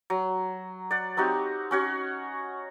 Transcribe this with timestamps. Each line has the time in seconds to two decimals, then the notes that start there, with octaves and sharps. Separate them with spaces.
0.10 F#3
0.91 D5 F#5
1.17 C4 D#4 F#4 G4
1.71 C#4 F#4 C#5